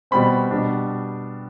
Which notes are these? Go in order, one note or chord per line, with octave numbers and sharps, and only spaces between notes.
B2 G3 C4 B5
B2 G3 D4